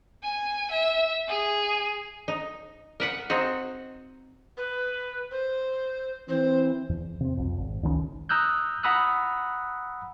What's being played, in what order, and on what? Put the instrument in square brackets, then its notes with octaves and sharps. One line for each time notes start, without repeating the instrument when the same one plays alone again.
[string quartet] G#5
E5
G#4
[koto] D#4
A#4 B4 F#5
C4 D#4 F#4
[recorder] B4
C5
[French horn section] E3 C4 [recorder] C5
[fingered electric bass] E2
C3 C4
B1 F2
G#1
C#2 D#3 G3 C#4
[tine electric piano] A#5 D#6 E6 F#6 G6
F#5 A#5 B5 D#6 E6 F#6